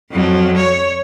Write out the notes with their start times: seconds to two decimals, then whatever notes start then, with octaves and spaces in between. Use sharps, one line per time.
0.10 F2 F#3
0.56 C#5